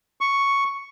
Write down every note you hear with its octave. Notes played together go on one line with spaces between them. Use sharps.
C#6